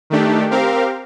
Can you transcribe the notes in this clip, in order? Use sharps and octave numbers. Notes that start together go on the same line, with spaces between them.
D#3 A3 D4 G4
C4 G4 A#4 F5